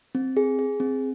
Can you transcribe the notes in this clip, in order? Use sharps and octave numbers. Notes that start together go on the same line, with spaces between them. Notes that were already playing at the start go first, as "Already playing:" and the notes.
C4
G#4
G#4
C4